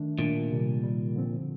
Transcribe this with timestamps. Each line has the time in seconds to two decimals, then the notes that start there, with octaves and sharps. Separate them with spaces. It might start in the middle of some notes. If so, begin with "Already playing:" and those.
Already playing: D#3 A3 D4
0.18 A#2 D#3 A3 D4
0.51 C3 D#3 G3
0.83 C3 D#3 G3
1.16 D3 F3 C4